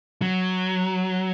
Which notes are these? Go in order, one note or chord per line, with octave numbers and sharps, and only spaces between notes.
F#3